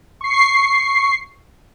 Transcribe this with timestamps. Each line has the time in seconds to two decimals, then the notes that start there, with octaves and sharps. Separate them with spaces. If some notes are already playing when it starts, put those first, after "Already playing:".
0.21 C#6 C7